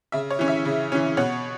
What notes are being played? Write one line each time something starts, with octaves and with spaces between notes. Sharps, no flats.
C#3 E5
C#5
E3 C#4
E5
C#3
E3 C#4
B2 C#5 F#5